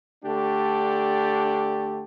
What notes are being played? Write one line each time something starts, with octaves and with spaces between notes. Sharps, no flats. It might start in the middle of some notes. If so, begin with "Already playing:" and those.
D3 A3 D4 G4